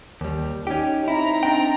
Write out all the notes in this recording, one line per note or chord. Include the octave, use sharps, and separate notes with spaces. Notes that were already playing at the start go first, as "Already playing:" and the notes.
D#2 G3
C#4 D#4 G4
C4 E4 A#5
D4 G5